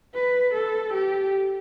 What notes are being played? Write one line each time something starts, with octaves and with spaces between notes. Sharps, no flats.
B4
A4
G4